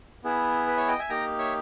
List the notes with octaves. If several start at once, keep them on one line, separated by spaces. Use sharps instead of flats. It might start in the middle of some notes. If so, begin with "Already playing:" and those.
B3 E4 G#4
B4
C#5 E5
D#5 G5
E5 G#5
A#3 D#4 G4 G5 A#5
C#5 E5